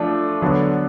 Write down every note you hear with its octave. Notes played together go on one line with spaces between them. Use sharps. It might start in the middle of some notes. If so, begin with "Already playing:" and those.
Already playing: F3 A3 D4
D3 F#3 B3 D4